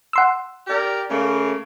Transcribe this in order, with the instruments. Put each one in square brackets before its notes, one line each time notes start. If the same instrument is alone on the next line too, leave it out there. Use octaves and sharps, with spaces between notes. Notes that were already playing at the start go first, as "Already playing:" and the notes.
[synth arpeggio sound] F#5 C6 E6
[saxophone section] G4 A#4 D5
C#3 A3 A#3